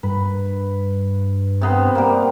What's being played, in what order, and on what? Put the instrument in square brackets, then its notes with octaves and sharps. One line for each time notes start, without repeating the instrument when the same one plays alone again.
[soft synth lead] G2 [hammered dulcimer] B4
[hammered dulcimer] C3 B3 C5
G3 A#3